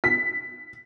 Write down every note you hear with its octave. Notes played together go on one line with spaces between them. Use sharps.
B6